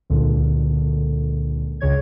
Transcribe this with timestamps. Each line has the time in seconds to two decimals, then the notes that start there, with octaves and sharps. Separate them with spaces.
0.10 C#2 A#2 D3
1.81 C#2 C#3 C#5 G#6